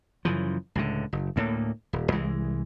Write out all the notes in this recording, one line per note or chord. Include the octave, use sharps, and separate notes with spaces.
F#2 C#3 E3 F3
C#2 A2 D3
F#1
D2 A2 A#3
D#1
C2 E3 G#3